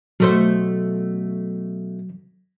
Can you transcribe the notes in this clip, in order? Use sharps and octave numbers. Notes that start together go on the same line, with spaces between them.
B2 F#3 A3 C5